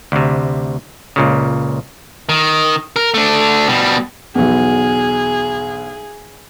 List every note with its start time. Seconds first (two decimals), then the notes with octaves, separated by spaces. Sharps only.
0.12 D2 C3
1.16 C#2 A#2 C#3
2.29 D#3
2.96 A#4
3.14 A3 D4
3.68 B2 G3
4.35 B1 E2 G#4